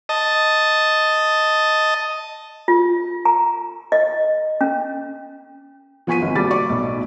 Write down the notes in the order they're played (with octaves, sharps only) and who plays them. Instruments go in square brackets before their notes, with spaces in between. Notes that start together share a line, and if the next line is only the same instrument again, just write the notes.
[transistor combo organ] D#5 A5
[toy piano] F4
A#5
D#5
C#4
[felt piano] F3 B3 G#5 C#6 B6 D#7
G#1
F#1 F#3 G3 B5 D6 A6
D5 C#6 D6
B1 A2